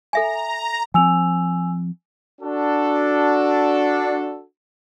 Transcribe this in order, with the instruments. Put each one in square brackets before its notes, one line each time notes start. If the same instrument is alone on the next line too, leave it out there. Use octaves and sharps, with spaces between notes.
[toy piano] A4 E5 G#5 [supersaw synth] A#5
[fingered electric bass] F3 C4 [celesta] G#5 E6 F7
[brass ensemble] D4 F#4 A4